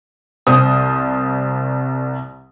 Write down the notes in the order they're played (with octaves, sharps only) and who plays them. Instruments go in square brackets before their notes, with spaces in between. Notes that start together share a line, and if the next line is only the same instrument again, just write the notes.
[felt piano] C2 C5 D#6